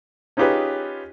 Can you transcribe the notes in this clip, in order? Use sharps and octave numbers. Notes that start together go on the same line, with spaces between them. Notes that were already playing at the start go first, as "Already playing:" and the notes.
C#4 D#4 F4 G4 G#4 B4